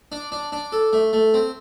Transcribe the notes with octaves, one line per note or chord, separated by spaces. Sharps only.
D4
D4
D4
A4
A3
A3
C4